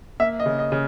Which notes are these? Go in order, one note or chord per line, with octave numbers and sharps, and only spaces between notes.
A#3 E5
D#5
C#3
D#5
C#3